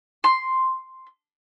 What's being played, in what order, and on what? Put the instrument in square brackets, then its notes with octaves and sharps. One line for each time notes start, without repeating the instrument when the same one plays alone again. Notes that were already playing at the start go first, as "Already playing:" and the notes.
[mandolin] C6